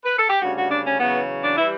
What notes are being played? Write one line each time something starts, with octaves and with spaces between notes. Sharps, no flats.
B4
A4
G4
D2 C#3 G3 F#4
F#4
D4
C#4
E2 C#3 F#3 B3
D4
E3 G3 E4